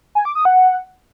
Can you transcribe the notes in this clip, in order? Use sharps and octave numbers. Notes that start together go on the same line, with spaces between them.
G#5
D6
D#6
F#5